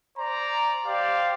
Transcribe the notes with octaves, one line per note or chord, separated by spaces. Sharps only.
C5 D5 A#5
G4 C5 D5 F5